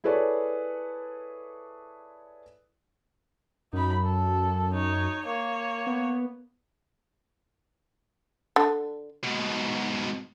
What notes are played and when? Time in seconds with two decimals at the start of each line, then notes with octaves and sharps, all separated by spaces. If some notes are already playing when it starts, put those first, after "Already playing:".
0.04 E4 G#4 A4 B4 C#5 D5
3.73 F#2 D#4 B5
4.04 A4
4.73 D#4 C#5
5.25 A#3 C#5
5.87 B3
8.56 D3
9.23 G#2 B2